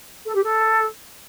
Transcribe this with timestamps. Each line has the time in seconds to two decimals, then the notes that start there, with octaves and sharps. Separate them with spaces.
0.25 A4
0.34 G4
0.43 A4